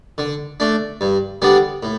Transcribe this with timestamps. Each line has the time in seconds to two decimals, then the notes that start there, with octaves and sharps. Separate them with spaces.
0.18 D3
0.60 A3 D4
1.01 G2
1.42 D3 G3 B3 D4
1.83 A2